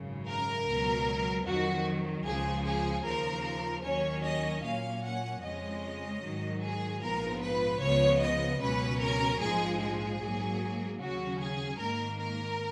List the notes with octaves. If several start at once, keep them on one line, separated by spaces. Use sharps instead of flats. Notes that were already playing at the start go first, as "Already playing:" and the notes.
Already playing: G#1 F#2 C#3
A#4
C#2 B2 F#3
F2 D#3 F#3 F#4
C#2 C#3 F3 G#4
G#4
D#2 C#3 F3 A#4
D#2 D#3 F#3 C#4 C#5
D#5
A#2 F#3 A#3 C#4 F5
F#5
F2 C#3 G#3 C#4 D#5
G#2 D#3 F#3
G#4
A#1 G#2 F3 B3 A#4
B4
C#2 C#3 F3 B3 C#5
D#5
C#2 B2 F#3 C#4 B4
A#4
A#1 G#2 F3 G#3 G#4
G#4
G#2 F#3 A#3
D#2 C#3 F#3 C#4 F#4
G#4
G#1 G#2 D#3 A#3 A#4
A#4